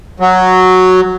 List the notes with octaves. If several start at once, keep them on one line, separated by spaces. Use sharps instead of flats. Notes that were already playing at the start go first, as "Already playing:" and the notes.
F#3